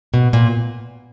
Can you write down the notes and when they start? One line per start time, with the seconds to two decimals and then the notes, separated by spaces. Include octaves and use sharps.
0.14 B2
0.33 A#2